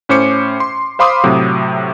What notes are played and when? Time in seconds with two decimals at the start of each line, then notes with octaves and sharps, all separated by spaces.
0.09 A2 C#4 C5 D6 C#7
0.60 C6
0.99 C5 F5 B5 C6 D6 D#6
1.23 A2 C3 F#3